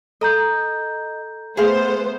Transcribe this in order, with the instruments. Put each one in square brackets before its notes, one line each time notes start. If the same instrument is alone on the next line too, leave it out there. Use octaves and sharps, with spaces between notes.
[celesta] A4 A#5 G6 [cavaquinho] D#5
[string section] A3 B3 C5 [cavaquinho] G#4 F5 C6